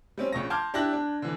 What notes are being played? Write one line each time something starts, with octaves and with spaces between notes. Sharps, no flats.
G3 C4 C#4
A#1 C#3 C#6 A#6
A5 C6 D6 F6 G6 G#6
D4 E4 G4 F#6 A#6 F#7
D4
D3 E3